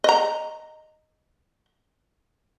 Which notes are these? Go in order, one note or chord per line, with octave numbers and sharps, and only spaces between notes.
D#5 A#5